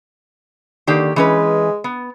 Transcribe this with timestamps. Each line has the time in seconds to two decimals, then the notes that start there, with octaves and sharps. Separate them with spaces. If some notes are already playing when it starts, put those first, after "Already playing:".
0.87 D3 D#3 A#3 G4
1.16 E3 G#3 C#4 B4
1.84 B3